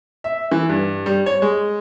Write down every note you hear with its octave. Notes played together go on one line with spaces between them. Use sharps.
E5
E3
G2
G3
C#5
G#3